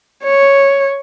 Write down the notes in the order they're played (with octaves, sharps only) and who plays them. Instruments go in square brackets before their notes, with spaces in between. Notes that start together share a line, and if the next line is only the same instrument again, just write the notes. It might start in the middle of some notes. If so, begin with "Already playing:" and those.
[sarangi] C#5